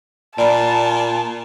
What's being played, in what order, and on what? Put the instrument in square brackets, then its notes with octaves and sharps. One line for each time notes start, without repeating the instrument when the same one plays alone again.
[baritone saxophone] A#2 [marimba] D5 B5 [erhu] A5